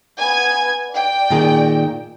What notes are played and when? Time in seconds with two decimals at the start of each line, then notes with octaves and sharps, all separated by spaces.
0.18 B3 G#5 G#6
0.92 D5 G5
1.30 A#2 D#3 G#4